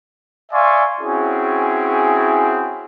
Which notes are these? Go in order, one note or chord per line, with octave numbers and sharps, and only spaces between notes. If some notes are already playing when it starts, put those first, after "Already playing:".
D5 E5 F5 G#5 C6 C#6
C4 C#4 E4 F#4 G#4